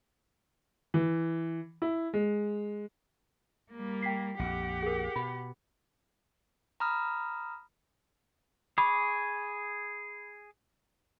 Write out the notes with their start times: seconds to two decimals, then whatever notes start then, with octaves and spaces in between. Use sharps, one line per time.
0.94 E3
1.82 E4
2.13 G#3
3.71 G3 A#3
4.02 G5 B6 C7
4.39 A#1 F2 G4 F#5
4.83 G#4 A#4
5.16 B2 B5
6.80 A#5 B5 D#6 F6
8.78 G#4 B5 C#6 D6